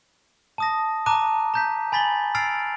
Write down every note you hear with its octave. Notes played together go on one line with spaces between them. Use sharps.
A5 D#6 A#6
A5 A#5 D6 F#6 D#7
A#5 G6 B6
G#5 B5 A6 B6 F#7 G7
E6 F6 A6 C7 D7 F7